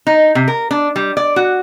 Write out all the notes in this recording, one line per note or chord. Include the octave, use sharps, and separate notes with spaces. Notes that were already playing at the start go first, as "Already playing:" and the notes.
D#4
C3
A#4
D4
G3
D5
F#4